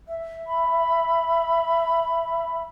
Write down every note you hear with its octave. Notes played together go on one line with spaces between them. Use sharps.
E5
B5